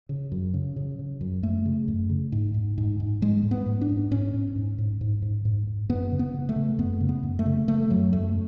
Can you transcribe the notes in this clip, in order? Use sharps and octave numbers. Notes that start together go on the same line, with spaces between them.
C#3
F#2
C#3
C#3
C#3
F#2
F#2 A3
C#3
F#2
C#3
G#2
G#2
G#2
G#2
G#2 G#3
G#2
B3
G#2
D4
G#2
G#2 C#4
G#2
G#2
G#2
G#2
G#2
G#2
G#2
F#2 B3
C#3
B3
C#3
A3
C#3
F#2 B3
C#3
B3
F#2
A3
C#3
C#3 A3
F#2 F#3
F#2 A3